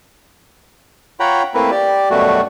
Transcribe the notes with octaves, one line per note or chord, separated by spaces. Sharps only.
F4 C#5 F#5 G5 A#5 B5
A3 A#3 C4 E4 A#4 B4
G4 D5
F#2 B2 G3 A3 F#4